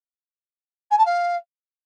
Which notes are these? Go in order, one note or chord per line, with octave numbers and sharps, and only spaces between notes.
G#5
A5
F5